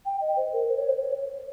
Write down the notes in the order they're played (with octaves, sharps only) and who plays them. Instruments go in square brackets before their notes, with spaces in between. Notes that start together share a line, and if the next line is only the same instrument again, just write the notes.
[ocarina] G5
D#5
C5
A#4
C5
C#5
C5
C#5